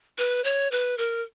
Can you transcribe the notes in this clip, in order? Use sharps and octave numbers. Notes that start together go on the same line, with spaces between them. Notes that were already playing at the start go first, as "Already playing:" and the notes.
B4
C#5
B4
A#4